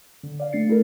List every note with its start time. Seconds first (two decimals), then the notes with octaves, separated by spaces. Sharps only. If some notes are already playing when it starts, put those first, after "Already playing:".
0.23 D3
0.40 D5 F5
0.53 A3 D4 A6 C7 C#7
0.68 A3 E4 A4 A#4